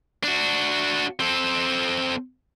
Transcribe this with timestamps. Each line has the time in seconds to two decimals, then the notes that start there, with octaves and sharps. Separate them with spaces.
0.23 D4 F#4
1.20 C4 A4